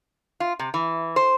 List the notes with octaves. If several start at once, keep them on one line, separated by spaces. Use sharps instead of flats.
F4
C3
E3
C5